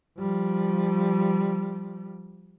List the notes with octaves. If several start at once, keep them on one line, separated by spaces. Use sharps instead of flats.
F3 G3